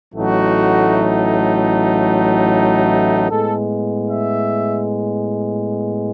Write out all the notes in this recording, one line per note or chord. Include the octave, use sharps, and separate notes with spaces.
A1 A2 F#3 A3 D#4 F#4
A2 G#3 B3 A4
E5